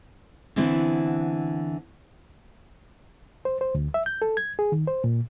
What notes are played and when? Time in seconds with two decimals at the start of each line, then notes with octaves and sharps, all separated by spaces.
0.56 D3 E3 B3 C4 E4
3.45 C5
3.61 C5
3.75 D2
3.94 E5
4.06 G6
4.22 A4
4.37 G#6
4.59 G#4
4.72 D#3
4.87 C5
5.04 A#2